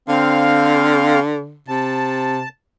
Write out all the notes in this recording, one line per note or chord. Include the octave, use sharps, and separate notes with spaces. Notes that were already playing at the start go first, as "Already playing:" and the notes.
D3 C4 F5
C3 A5